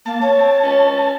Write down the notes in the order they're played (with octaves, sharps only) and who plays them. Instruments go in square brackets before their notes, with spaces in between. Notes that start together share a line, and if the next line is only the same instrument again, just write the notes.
[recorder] A#3 [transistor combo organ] A5
[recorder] C#5
[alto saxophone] C4
C#4